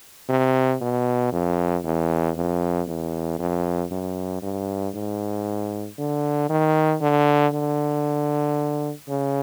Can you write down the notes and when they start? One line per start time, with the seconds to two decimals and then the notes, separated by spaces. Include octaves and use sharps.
0.29 C3
0.81 B2
1.32 F2
1.84 E2
2.36 F2
2.88 E2
3.39 F2
3.91 F#2
4.42 G2
4.94 G#2
5.98 D3
6.49 D#3
7.01 D3
7.53 D3
9.08 C#3